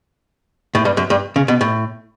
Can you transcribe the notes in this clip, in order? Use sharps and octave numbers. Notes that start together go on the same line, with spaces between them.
A2
G2
F#2
G2
C#3
B2
A2